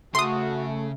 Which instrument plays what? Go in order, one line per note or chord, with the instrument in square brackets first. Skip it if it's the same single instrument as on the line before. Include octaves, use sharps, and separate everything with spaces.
[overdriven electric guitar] C#3 [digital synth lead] A3 [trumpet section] F#4 [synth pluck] C6 D#6